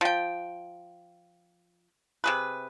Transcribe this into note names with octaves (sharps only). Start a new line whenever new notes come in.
F3 G5
C3 G#4 B4